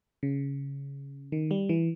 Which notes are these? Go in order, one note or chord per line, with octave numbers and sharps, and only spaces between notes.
C#3
D#3
G3
E3